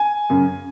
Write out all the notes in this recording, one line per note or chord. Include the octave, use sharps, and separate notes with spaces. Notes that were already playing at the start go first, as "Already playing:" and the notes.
Already playing: G#5
F#2 C#3